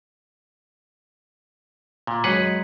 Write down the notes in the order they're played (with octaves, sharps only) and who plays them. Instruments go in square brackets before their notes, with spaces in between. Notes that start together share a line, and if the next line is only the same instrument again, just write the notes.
[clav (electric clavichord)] A#2
[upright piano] F#2 C#5 [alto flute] G#3 [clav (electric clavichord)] G#4 B4 F#5